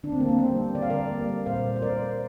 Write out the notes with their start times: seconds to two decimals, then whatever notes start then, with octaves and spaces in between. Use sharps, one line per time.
0.03 D3 D4
0.12 C4
0.20 A#3
0.28 C4
0.39 G3 A#3 C4
0.75 D3 D5
0.82 F5
0.90 A#4 D5
1.11 G3 A#3
1.46 A#2 C5 F5
1.76 C5
1.82 G3 A#3 A#4 D5